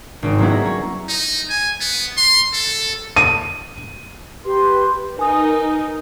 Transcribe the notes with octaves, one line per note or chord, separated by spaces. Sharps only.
G#1 C4 D#4
F#3 G3 A#3 B3 C#4 E4
A#5
C#5
D#4
G#5
B3
C6
A4
D#7
G4 B4 C6
D#4 A#4 B4 G#5 D#6